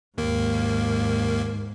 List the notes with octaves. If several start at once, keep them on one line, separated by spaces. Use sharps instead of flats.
D#2 G#2 A#3